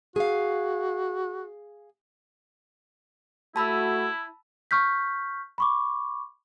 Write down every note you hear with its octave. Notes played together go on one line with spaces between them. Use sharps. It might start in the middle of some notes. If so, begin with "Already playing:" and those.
F#4 G#4 F5
A3 E4 F#4 A5 B5 E6
C#6 F6 G6 B6
B5 C#6 D6